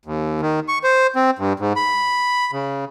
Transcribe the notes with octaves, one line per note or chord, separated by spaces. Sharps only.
D#2
D#3
C#6
C5
C4
G2
G#2
B5
C#3